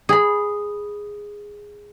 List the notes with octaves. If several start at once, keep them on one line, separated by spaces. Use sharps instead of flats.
G#4 B5